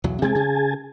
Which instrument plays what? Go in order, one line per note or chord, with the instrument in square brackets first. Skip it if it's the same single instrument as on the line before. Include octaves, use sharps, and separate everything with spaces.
[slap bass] B1 E2 F#3
[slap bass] C3 G#3 C4 [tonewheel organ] G#4 G#5 A5
[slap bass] C#3